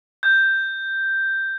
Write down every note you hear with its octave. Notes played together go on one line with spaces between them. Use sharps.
G6